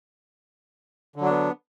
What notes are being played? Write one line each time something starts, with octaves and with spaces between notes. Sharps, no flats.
D3 F#3 B3 D4